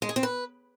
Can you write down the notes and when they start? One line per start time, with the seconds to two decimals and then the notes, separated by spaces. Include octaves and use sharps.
0.02 G#3
0.09 G#4
0.16 C4
0.23 B4